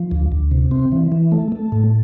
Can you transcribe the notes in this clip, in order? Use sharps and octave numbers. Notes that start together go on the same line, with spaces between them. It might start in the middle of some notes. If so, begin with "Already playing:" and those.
Already playing: F3
D2
D2
C3
C4
E3
E3
A3
A3
A2